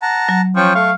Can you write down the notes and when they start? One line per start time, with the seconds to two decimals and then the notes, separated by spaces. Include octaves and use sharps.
0.02 F#5 A5 A#5
0.29 F#3
0.56 F3 C#4 G5 C#6
0.75 A3 F5 C#6